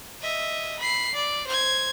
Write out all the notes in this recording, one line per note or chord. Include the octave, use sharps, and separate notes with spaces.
D#5 E5
B5 C7
D5
C5 G#6